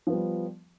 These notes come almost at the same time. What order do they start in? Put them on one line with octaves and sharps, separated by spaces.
F3 B3 G3